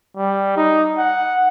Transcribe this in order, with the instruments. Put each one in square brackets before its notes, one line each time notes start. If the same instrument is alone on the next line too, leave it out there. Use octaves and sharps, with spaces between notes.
[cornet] G3
D#4
F#5